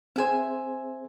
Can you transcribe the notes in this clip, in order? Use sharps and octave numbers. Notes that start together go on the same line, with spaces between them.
C4 G#4 C5 E5 G#5